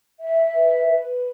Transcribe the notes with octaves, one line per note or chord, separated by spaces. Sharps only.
E5
B4
B4